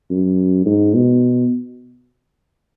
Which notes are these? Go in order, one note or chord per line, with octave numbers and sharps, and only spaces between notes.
F#2
G#2
B2